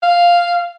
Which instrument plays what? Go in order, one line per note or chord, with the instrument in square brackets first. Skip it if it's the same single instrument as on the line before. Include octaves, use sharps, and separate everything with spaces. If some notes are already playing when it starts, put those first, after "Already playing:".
[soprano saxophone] F5